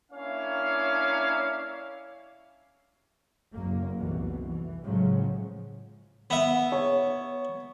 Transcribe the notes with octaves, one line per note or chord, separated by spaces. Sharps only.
A#3 C#4 D4 E4 C#5 F5
F#1 F#2 A#3
F1 C2 B2 E3
E3
A2 C#3 F3 F#3 G#3
B3 E5
C#5